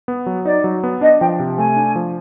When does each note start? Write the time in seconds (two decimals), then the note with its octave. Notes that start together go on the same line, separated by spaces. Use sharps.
0.08 B3
0.26 F#3
0.45 D#4 D5
0.64 F#3
0.83 B3
1.01 D4 D#5
1.21 F3 G5
1.39 C3
1.58 A3 G#5
1.76 D4
1.96 F3